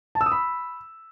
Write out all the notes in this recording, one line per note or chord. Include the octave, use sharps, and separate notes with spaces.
A5
E6
D#6
B5